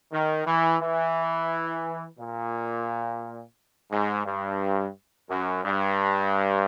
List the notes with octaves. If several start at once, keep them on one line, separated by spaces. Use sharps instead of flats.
D#3
E3
E3
A#2
G#2
G2
F#2
G2